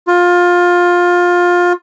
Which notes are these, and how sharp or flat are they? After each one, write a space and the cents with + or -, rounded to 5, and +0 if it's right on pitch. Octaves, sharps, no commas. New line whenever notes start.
F4 +20